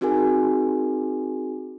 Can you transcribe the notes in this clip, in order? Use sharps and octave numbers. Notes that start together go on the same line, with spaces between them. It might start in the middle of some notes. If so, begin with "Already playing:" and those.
C4 D#4 F#4 G#4 A#4 G#5